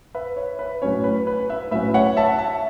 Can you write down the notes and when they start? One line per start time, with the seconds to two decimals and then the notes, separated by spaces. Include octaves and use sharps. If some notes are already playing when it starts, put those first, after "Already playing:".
0.15 B4 E5
0.36 C#5
0.59 B4
0.82 A2 F#3 C#4 C#5
1.04 B4
1.27 B4
1.50 B4 E5
1.71 A2 F#3 C#4 B4 E5
1.94 C#5 F#5
2.17 E5 A5
2.39 E5 A5